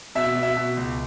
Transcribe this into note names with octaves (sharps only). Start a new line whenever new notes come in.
B2 E5
B2
E5
B2
C#2